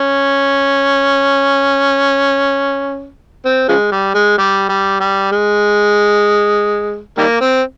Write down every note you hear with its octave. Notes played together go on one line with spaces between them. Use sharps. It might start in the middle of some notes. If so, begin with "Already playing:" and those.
Already playing: C#4
C4
C#3 F3 G#3
G3
G#3
G3
G3
G3
G#3
D#3 G3 A#3
C4